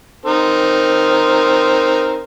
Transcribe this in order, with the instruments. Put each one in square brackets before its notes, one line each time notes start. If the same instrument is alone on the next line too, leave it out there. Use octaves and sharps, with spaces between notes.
[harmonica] C4 D#4 A#4